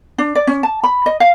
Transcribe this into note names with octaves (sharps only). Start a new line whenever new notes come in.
D4
D5
C#4
A5
B5
D#5
F5